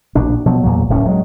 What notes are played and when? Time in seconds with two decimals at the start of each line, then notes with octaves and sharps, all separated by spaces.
0.15 A#1 B2 D4
0.46 B2 F3 F#3
0.63 E2 A#2 F#3
0.89 D1 A2 D3 C#4
1.06 F#3 G#3